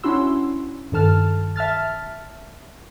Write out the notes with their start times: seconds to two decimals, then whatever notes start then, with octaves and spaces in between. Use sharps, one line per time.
0.04 C#4 D4 E4 F#4 C6 E6
0.92 G2 D#3 A4 A5 F6
1.56 E5 A5 F6 A6